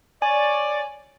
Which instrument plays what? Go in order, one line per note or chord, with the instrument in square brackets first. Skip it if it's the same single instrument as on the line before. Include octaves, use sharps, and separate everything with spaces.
[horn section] C#5 D5 [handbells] G#5